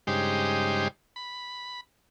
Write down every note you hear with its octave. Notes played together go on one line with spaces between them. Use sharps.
G2 C#3 G#3 D#4 G4 C5
B5